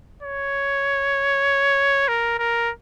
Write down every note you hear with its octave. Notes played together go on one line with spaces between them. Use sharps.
C#5
A#4
A#4